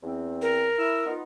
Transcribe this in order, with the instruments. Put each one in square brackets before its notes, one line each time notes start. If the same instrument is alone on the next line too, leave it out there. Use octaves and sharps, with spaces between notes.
[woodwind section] E2 C4
[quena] A#4
[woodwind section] E4 E6
B3 D#4 F4